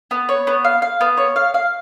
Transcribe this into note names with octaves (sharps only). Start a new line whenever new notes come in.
B3
C#5
B3
F5
F5
B3
C#5
F5
F5